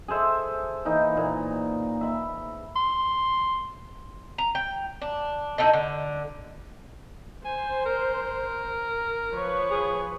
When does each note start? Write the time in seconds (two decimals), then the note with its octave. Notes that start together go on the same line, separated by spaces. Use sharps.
0.08 G#4 A4 C5 E5
0.85 E3 A#3 D#4
1.17 A#2
2.01 E5 B5
2.76 C6
4.38 A#5
4.55 G5
5.02 D4
5.58 D#4 E4 A4 D#5
5.73 D3
7.45 C5 G#5
7.85 A#4
9.32 F3 B4 C#5
9.71 G#4